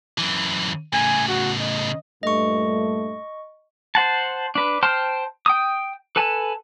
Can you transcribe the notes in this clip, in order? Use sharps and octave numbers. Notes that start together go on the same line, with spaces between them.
F#2 E3
A2 C#3 G#5
F#4
D#5
G2 A#2 A3 D#5 C#6
C5 F#5 A5
D4 B4
C5 G5 A5 C6 F6
G5 D#6
A4 B4 G#5 A5